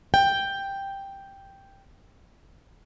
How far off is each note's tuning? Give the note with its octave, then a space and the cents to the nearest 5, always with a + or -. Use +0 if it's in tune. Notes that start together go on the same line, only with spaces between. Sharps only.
G5 +5